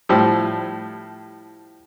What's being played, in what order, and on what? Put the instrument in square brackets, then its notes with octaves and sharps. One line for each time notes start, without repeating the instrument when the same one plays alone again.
[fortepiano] A2 F3 G3